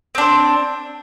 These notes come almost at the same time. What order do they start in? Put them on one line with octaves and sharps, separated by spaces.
C4 D4 C5